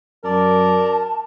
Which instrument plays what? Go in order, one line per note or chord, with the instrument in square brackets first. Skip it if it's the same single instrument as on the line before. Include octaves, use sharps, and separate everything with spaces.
[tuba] F#2 [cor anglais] A#4 [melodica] D5 [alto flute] A5